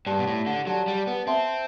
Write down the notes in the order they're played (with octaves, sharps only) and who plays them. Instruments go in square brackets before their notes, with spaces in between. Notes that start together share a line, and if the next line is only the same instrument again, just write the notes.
[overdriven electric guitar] G2 [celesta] G4 D5 A5
[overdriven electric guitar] B2
A2
D3
[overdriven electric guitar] F#3 [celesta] G4 D5 A5
[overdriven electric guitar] G3
B3
[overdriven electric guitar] C4 [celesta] C5 E5 A5 C6